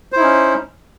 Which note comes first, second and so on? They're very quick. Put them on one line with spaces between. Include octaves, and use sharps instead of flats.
C5 E4 D#4 C#4